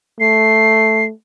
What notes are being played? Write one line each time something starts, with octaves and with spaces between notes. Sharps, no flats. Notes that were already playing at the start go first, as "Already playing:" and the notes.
A3 C7